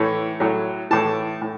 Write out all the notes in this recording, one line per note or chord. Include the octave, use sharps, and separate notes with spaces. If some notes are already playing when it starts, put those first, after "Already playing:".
Already playing: A2 E3 C#5
A2 F#3
A2 E3 A5
A2